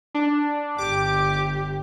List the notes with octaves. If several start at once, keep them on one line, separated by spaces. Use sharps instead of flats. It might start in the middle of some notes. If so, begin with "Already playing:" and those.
D4
G1 G4 D6